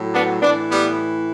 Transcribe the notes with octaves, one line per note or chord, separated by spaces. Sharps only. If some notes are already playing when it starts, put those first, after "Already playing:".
Already playing: A2 F#3
B3 D4
A2 E3 B3 D4
G3 B3